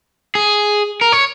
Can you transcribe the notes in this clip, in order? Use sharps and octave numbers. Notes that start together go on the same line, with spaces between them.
G#4
A#4
C#5